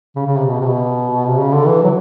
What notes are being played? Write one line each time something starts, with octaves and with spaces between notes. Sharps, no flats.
C#3
C#3
C3
B2
C3
B2
C3
C#3
D3
E3
F#3